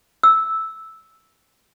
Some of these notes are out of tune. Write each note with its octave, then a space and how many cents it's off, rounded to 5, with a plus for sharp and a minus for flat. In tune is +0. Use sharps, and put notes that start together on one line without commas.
E6 -10